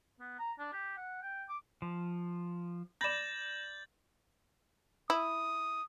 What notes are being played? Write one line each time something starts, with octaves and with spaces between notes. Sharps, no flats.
B3
A#5
D4
G4
F#5
G5
D6
F3
D5 B5 G6 A6 A#6 E7 F#7
E4 D#6